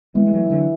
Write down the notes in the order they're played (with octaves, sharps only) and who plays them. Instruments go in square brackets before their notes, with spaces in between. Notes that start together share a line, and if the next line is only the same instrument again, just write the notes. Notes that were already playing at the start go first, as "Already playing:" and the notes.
[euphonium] E3 [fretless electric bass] G#3 B3
[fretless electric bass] G#3
F#3 A3
G#3
D3 F#3